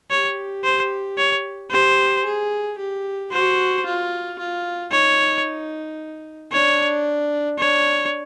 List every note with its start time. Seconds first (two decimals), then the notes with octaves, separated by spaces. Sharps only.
0.11 G4 C#5
0.64 C5
1.18 C#5
1.71 G4 C5
2.25 G#4
2.78 G4
3.31 F#4 C5
3.85 F4
4.38 F4
4.92 D#4 C#5
6.52 D4 C#5
7.59 D4 C#5